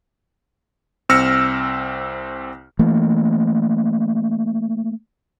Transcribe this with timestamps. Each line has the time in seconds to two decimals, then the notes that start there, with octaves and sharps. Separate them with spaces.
1.09 C2 C4 E6 F6 A#6 C#7
2.79 E3 A3 A#3